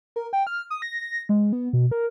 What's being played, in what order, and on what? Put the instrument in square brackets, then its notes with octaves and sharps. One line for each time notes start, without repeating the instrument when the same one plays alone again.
[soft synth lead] A#4
G5
F6
D#6
A#6
G#3
B3
B2
A#4